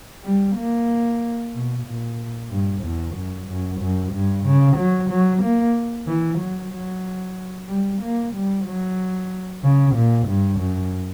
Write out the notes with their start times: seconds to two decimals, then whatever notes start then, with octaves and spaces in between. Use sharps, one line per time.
0.23 G3
0.56 A#3
1.54 B2
1.85 A#2
2.50 G2
2.83 E2
3.15 F#2
3.48 F#2
3.80 F#2
4.12 G2
4.44 C#3
4.77 F#3
5.10 F#3
5.43 A#3
6.06 E3
6.39 F#3
6.71 F#3
7.68 G3
8.02 A#3
8.34 G3
8.65 F#3
9.63 C#3
9.95 A#2
10.27 G2
10.60 F#2